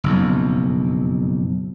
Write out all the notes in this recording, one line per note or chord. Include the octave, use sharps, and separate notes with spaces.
F#1 B1 F2